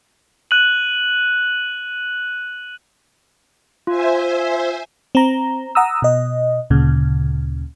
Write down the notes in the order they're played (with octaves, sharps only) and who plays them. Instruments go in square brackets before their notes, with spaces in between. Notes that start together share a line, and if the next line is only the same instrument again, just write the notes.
[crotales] F#6 D#7 F#7
[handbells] F4 [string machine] C5 E5 G#5
[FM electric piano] C4 A#5
F#5 A#5 D#6 E6
B2 D#5
D2 A#2 C#3